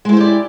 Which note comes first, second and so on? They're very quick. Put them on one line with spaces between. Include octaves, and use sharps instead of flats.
G#3 E4 C5 G4 D5